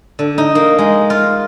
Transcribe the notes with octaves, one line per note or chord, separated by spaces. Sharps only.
D3
D#4
A#3
G#3
F4